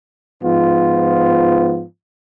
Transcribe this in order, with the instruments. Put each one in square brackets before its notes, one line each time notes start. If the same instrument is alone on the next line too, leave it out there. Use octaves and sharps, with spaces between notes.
[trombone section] G#2 F3 B3 F4